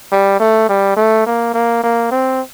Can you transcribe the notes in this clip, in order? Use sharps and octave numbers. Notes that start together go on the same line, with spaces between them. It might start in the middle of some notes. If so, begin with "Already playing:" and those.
G3
A3
G3
A3
A#3
A#3
A#3
C4